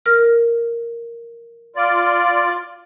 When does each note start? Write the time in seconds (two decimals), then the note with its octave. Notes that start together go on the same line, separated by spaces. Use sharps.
0.06 A#4 F6
1.76 F4 D5